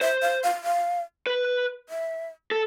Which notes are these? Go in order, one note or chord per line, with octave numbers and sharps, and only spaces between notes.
C5 E5
F5
F5
F5
B4
E5
A4